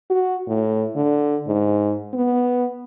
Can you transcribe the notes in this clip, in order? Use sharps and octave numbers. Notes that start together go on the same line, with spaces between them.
F#4
A2
D3
G#2
B3